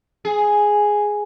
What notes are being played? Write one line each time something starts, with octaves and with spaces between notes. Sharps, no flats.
G#4